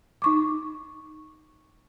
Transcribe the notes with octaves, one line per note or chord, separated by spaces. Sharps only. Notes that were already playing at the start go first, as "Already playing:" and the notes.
D#4 C#6 D6